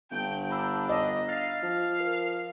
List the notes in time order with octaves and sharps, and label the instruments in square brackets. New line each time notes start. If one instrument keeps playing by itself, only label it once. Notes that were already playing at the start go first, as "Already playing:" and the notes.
[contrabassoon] G1 [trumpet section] G5
[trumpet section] D4 [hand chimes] A#5 B5 E6
[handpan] D#5
[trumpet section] F5 [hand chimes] A6
[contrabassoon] F3
[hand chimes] A#4